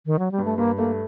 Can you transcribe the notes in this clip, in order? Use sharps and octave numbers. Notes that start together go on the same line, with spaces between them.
D#3
F#3
G3
G2
A3
G2 A#3
A3 A#3